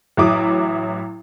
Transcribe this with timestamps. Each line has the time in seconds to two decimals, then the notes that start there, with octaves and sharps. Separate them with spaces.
0.17 A1 F#3 E4 D6 D#6